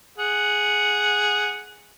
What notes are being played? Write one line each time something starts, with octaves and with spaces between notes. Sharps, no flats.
G#4 F#5